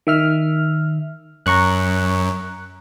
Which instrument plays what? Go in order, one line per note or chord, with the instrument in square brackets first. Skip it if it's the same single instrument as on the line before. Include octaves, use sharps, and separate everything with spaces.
[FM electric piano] D#3 E5 F6
[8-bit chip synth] F#2 [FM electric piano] A#5 C#6 F#6